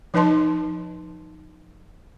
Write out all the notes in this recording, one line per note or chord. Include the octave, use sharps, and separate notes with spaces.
F3 D#4 B4 D#5 A5 C6